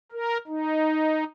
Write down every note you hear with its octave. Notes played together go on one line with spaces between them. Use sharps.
A#4
D#4